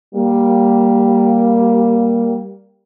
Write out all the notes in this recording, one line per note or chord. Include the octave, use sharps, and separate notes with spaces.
G3 A#3